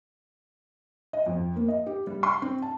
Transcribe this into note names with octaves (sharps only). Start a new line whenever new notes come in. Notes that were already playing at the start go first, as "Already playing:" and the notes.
D#5
F2
A#3
D#5
G4
G3
C6
C4
A5